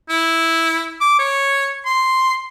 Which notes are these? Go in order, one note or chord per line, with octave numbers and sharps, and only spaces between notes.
E4
D6
C#5
C6